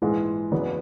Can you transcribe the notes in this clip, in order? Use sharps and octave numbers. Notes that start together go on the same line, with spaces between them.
A#1 G#2 E3 G#3
F#1 E2 C#3 F#3 B3